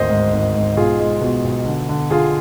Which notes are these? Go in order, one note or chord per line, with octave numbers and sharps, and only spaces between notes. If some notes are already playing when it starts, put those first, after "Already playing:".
Already playing: G#1 D2 C5 D#5
G#2
G#1
G#2
B1 F4 G#4
G#3
B2
B1
D3
D3
D3 F4 G#4